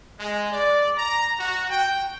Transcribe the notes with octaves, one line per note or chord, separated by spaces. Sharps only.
G#3
D5
A#5
F#4
G5